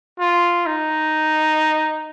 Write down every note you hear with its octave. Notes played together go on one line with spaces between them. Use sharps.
F4
D#4